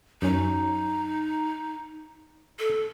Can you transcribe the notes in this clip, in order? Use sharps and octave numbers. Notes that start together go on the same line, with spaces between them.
F#2 C#4 D#4
A4